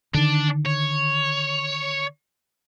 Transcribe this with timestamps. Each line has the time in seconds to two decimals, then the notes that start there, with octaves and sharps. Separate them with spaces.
0.14 D3 D#3 D4
0.66 C#5